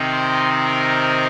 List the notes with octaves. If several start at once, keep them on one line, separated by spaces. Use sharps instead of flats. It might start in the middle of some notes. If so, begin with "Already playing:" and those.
Already playing: C3 D#3 C4 D#4
C5
A#4